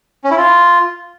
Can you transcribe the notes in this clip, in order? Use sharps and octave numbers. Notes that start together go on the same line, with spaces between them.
C#4
E4
F4